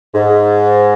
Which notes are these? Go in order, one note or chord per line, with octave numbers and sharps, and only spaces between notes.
G#2